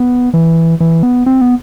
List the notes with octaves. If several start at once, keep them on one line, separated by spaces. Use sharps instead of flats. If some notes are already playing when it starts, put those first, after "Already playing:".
Already playing: B3
E3
E3
B3
C4
B3